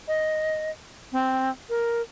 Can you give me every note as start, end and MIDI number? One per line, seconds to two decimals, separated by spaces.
0.08 0.71 75
1.12 1.49 60
1.70 2.01 70